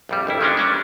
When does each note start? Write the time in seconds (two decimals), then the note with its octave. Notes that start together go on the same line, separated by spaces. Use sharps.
0.09 A#1 F2 G3
0.27 G1 F2 E4
0.41 D#3 G3 G#3 A#3 C#4 D4
0.57 G3 C#4 D4